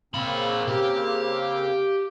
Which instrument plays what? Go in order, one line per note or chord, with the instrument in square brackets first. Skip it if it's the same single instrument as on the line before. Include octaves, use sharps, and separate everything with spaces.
[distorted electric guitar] A#2 B5 [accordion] C#3 A#3 C4 [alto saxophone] F5
[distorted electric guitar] G4